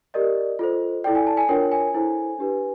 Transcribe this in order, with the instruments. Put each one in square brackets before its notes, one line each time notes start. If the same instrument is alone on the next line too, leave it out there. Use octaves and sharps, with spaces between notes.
[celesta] G4 A#4 D5 D#5
F4 A4 C5
E4 A4 D5 G5
G#5
A5
G#5
D4 F4 A#4 C#5 G5
G#5
E4 A4 C5
D4 G4 B4